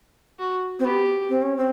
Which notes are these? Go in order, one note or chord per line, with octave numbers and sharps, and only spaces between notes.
F#4
C4
B3 G4
C4
C#4
C4